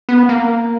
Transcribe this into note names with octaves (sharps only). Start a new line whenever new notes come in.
B3
A#3